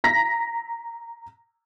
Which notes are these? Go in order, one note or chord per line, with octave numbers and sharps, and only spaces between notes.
A#5 A#6 B6